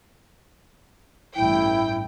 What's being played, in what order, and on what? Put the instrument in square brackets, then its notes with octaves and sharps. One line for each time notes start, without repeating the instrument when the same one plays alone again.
[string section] A1 G2 G5 [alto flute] E4